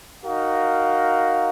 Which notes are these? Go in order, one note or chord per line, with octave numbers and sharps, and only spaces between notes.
D#4 F#4 A#4 F5